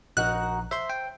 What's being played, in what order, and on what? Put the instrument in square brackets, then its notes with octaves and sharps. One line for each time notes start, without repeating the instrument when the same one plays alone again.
[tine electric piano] A#1 [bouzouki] D#4 F#4 A#4 [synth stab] F#6
[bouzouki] C5 [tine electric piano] E5 C6
[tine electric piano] G5